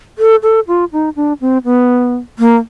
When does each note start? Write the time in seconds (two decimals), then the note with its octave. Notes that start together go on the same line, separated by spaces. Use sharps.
0.19 A4
0.43 A4
0.68 F4
0.92 D#4
1.16 D4
1.41 C4
1.65 B3
2.39 A#3